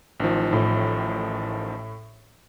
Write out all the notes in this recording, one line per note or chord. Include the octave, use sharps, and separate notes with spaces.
A1 D#3 F3
A2